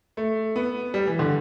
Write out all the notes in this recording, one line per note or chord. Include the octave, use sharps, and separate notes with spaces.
A3
B3
G3
E3
D3